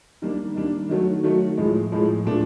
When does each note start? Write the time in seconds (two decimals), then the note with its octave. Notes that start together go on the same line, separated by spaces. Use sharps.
0.22 D#3 G3 A#3 D4
0.55 D#3 G3 A#3 D4
0.89 D#3 F#3 A3
1.23 D#3 F#3 A3
1.58 A2 F3 G#3
1.92 A2 F3 G#3
2.25 A#2 F3 A3 D4